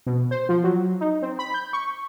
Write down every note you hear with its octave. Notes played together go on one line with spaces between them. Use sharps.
B2
C5
F3
F#3
D#4
C4
B5
G6
C#6